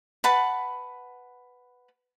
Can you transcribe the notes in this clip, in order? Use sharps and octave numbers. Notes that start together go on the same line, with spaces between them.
B4 F#5 A5 B5